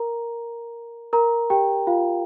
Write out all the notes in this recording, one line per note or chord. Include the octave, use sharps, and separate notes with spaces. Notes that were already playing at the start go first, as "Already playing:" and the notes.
Already playing: A#4 A#5
A#4 A#5
G4 G5
F4 F5